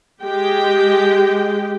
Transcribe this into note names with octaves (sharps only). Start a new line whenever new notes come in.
G#3 G4 G5